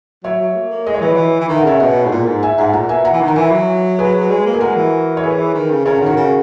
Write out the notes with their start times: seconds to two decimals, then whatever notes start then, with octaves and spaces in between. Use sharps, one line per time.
0.24 F#3 C#5 E5
0.40 F#3
0.55 A#3
0.71 A#3
0.86 G#3 D#5
0.95 C#5
1.02 E3 B4 D#5
1.14 F#3
1.17 E3
1.40 E3
1.48 D#3 E5
1.58 F#5
1.64 C#3 C#5 E5
1.80 B2 D#5 F#5
2.06 G#2
2.12 A#2
2.26 G#2
2.43 E5 G#5
2.58 G#2 F#5 A#5
2.73 A#2 F#5 A#5
2.89 B2 E5 G#5
3.05 F#5 A#5
3.12 E3
3.21 D#3
3.28 A#5
3.36 E3 E5 G#5
3.51 F#3
3.99 G#4 B4
4.30 G#3
4.46 A#3
4.53 G#4
4.60 G#3 F#4 A#4
4.76 E3
5.17 C#5
5.24 G#4 B4
5.55 D#3
5.71 C#3
5.85 C#3 A#4 C#5
5.96 F#4 A#4
6.01 D#3
6.06 F#4 A#4
6.17 C#3